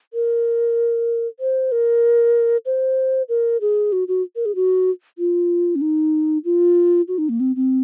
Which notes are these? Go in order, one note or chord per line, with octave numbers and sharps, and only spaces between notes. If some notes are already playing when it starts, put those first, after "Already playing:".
A#4
C5
A#4
C5
A#4
G#4
F#4
F#4
A#4
G#4
F#4
F4
C#4
D#4
F4
F#4
D#4
A#3
C4
C4